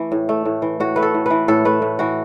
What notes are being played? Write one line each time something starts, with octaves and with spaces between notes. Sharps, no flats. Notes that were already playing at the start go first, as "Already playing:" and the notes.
Already playing: E3 A3
A2
A3
A2
E3
A2 F#4
A3 B4
A4
A2
E3 B4
A2 A4
A3 B4
A2
E3 F#4